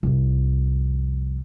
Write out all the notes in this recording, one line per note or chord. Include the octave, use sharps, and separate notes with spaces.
C2 F2